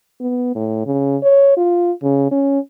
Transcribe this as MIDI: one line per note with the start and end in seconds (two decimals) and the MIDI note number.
0.20 0.53 59
0.55 0.82 45
0.86 1.17 49
1.23 1.54 73
1.57 1.92 65
2.03 2.31 49
2.31 2.59 61